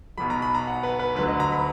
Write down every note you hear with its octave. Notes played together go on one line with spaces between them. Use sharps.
B1 B2 F#3 B5
A#5
B5
A#5
F#5
B4
B4
D2 D3 F#3 B4
D#5
A#5
B5